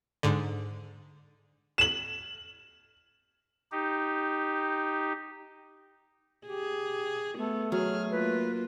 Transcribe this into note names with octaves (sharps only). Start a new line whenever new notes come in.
G#2 D3
E7 F#7
D#4 G4
G4 G#4
A3 B3 A4
F#3 G#4 F6
A#3 F4 B4